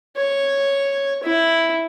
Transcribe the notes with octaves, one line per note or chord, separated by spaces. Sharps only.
C#5
E4